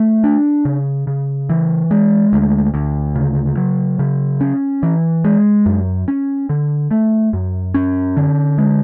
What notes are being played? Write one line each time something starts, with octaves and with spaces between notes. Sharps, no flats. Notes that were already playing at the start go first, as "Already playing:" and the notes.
Already playing: A3
D4
C#3
C#3
E3
G#3
D2
D2
C#3
F#3
C#3
C#4
E3
G#3
F#2
C#4
D3
A3
F#2
C#4
D3
G#3